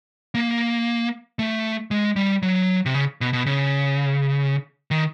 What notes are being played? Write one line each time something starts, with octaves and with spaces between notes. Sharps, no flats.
A#3
A3
G#3
G3
F#3
C3
C#3
B2
B2
C#3
D#3